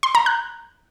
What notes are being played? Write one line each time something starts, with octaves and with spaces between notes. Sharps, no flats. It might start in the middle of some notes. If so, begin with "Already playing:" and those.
C6
A#5
F#6